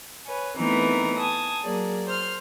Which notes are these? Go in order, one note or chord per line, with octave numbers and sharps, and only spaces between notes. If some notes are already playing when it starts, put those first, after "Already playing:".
B4 C#5 G#5
E3 A3 B3 C4 D#4 A#4
G#5 A5 D#6
F#3 A#3 G#4 D5
C5 C6 F6